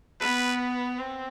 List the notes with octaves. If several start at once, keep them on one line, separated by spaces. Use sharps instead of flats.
B3 B4
C4